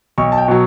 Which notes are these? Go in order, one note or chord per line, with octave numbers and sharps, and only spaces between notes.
B1 C#6
A5
G5
B2 F#3